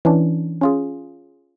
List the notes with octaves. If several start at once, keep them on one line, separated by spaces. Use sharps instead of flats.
E3 C#4 D4
C#4 F4 G#4